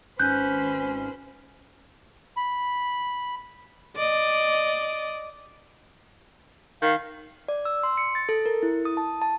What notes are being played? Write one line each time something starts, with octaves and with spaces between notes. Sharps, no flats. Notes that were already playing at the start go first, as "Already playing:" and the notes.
G#1 C#4 B4 C5 F#6 G6
B5
D5 D#5
D#3 F5
D5
E6
C6
C#7
A6
A4
A#4
E4
D#6
A5
A5